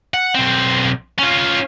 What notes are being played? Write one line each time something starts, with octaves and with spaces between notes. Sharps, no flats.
F#5
B1 C4
C#4 F4